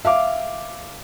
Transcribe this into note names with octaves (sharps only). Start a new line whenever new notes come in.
E5 F5 D6